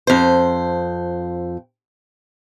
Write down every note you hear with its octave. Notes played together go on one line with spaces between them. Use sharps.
F2 C5